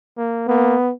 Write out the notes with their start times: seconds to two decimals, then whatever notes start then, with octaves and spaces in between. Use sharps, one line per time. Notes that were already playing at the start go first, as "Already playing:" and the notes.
0.18 A#3
0.48 A#3 B3